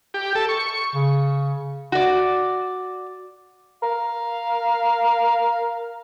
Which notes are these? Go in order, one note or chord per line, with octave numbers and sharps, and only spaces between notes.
G4
A4
C#6
C#3
F#4 D5
A#4 F5